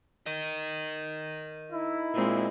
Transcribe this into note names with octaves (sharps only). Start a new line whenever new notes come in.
A#4 D#5
D#4 E4
A#2 G#3 C4